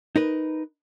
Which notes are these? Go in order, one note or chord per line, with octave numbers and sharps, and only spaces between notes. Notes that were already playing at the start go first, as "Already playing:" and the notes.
D#4 A#4 B4